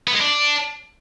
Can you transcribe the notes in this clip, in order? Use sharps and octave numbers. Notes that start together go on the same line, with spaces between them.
B3
G#3
D4